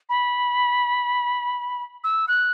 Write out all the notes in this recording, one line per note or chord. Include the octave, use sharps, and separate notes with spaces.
B5
E6
F#6